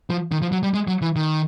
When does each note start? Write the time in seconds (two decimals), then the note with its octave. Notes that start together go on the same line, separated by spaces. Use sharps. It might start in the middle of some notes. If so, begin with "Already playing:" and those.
0.10 F3
0.32 D#3
0.42 F3
0.52 F#3
0.63 G3
0.74 G#3
0.88 F#3
1.02 E3
1.16 D#3